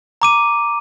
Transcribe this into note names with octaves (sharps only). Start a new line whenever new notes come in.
A#5 D6 D#7